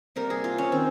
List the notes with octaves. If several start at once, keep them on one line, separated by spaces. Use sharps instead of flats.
C3 G3 A#3 A#4
G#4
F4
C#4
D#3 C4